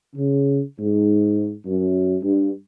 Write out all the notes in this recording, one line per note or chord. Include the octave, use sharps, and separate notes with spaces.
C#3
G#2
F#2
G2